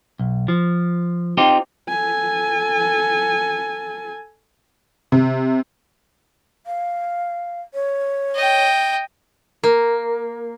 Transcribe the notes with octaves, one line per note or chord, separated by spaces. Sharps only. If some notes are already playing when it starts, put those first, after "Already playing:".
B1
F3
C4 D#4 F4 G4
A4 G#5
C3
F5
C#5
D#5 G5
A#3